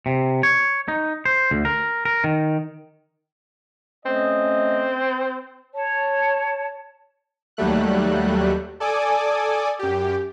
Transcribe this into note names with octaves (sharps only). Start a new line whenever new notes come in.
C3
C#5
D#4
C5
D2
A#4
A#4
D#3
A3 C4 C#4 D#5
C#5 A5
D#2 F#3 G3 A3 F#6
A4 D5 G#5 D6 D#6
F#2 G4